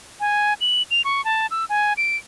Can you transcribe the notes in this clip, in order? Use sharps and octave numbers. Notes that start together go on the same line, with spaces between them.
G#5
F#7
F7
C#6
A5
E6
G#5
D7